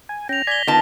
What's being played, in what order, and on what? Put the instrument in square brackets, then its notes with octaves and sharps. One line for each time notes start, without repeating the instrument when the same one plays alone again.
[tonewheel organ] G#5
[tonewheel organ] C#4 G5 [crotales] A#6 F7
[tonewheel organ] D5 G#5 G#6 [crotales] B6 G7
[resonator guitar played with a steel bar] D#3 A5 [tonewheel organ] B3 F4 A#5